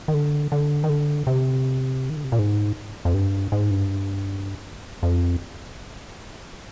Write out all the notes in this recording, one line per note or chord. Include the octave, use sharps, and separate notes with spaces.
D#3
D3
D3
D#3
D3
C3
D#3
D3
C3
A#2
G#2
F2
G2
G#2
G2
F2